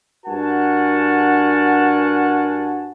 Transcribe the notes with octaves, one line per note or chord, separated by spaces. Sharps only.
G2 F#4 A#4 F#5 G#5 A5